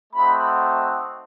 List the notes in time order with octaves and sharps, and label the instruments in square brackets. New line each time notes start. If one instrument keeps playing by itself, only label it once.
[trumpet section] A3 C4 D#4 F#4 B5